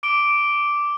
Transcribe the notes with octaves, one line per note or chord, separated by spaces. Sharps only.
D6 D7 G7